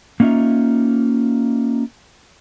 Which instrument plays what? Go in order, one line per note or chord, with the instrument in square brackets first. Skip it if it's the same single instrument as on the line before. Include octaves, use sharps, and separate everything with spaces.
[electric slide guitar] A#3 C#4 D#4 F4 E5